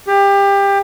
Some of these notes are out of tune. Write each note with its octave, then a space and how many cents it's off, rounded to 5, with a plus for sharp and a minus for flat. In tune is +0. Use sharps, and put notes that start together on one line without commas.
G4 +25